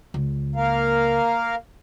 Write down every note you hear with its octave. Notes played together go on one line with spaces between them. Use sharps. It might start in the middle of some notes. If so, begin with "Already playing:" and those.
C#2
A#3 A#4 F5